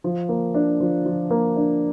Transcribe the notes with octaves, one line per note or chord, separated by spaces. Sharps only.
F3
A#3
D4
F3
F3
A#3
D4